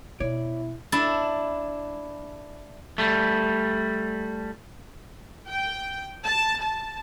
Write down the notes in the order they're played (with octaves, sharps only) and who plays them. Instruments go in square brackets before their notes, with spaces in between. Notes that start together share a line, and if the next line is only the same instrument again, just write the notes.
[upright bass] B2 [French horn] E4 [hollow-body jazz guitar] C#5 D5
[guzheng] D4 E4 A5
[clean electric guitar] G3 A3
[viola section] G5
A5
A5